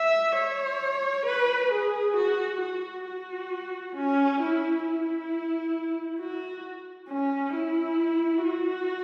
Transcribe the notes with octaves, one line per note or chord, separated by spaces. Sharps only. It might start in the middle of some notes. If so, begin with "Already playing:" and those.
Already playing: E5
C#5
B4
G#4
F#4
F#4
F#4
C#4
E4
E4
F#4
C#4
E4
F#4